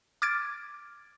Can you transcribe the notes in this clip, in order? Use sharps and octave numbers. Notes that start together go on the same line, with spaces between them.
D6 F6 G#6 A6 D7